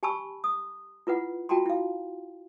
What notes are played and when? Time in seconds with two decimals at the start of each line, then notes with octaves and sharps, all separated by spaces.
0.03 G4 G#5 A5 B5 C#6 E6
0.44 D#6
1.07 E4 F4 B4 F#5
1.49 F4 F#4 G5 A5 A#5 C6
1.66 E4 F5